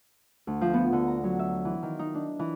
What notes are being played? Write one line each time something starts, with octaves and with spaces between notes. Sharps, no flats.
D2
F3
B3
D3
A#5
F#3
E5
E3
D#3
D#4
D4
E3